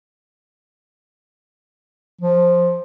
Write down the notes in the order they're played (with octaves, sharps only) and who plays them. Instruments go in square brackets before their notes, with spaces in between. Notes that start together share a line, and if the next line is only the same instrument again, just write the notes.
[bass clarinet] F3